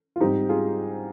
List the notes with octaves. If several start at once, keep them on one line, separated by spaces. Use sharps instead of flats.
F4
G#2 G3 C4 D#4 G4
F4 G#4